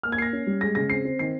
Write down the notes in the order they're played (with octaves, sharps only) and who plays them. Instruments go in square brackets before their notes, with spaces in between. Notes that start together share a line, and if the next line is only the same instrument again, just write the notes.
[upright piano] A#3 F6
G#6
A#3 C7
A#6
C#4
G3
G#3 A#6
C#3 A#6
C4 C7
C4
D#3 C7